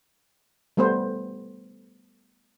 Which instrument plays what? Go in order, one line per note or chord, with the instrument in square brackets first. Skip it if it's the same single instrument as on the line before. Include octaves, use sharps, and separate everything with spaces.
[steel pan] G3 A3 B3 B4 C5